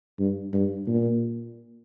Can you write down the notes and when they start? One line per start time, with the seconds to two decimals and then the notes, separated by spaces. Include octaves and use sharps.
0.19 G2
0.53 G2
0.87 A#2